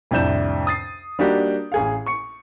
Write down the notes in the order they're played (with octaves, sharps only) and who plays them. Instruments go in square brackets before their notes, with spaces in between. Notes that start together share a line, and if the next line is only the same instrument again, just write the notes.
[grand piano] C2 F2 A2 D4 G6 E7
D#6 A6 C7
G3 A#3 D4 D#4 F#4 G4
A1 G#4 F5
C#6 C#7